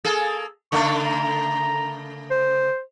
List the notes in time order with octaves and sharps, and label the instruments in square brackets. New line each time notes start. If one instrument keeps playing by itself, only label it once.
[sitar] A#3 G#4 A4
[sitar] C#3 A3 A#3 [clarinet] C#6
[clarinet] A#5
C5